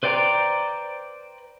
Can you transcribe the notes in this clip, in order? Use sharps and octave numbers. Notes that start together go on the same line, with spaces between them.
B4 C5 D5 G5 A#5